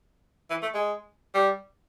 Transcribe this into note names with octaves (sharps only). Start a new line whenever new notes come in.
E3
A3
G#3
G3